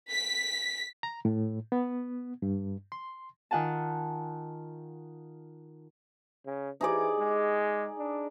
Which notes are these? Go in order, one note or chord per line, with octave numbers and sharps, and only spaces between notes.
B6
A#5
A2
B3
G2
C6
D#3 F4 F#5 G#5 A5
C#3
E3 D#4 G#4 D5
G#3
D4